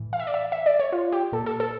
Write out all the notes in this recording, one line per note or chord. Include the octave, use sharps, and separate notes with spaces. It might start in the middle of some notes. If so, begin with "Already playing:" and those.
Already playing: A2 E3
F5
E5
D5
E5
E5
D5
C#5
F4
G4
A#2 A4
A4
A4